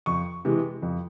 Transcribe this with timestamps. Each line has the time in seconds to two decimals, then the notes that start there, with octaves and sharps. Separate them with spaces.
0.06 F2 C#6
0.45 C3 E3 G#3
0.82 F2